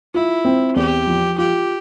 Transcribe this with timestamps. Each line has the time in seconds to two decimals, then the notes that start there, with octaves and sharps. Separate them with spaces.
0.14 E4 F4
0.45 C4
0.76 E2 G4
1.07 F3
1.38 F4 G4